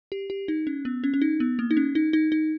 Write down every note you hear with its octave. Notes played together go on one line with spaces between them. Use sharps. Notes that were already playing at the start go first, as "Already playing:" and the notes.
G4
G4
D#4
C#4
B3
C#4
C#4
D#4
B3
A#3
D#4
C#4
D#4
D#4
D#4